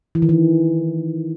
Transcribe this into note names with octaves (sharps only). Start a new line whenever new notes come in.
E3
D#3
E3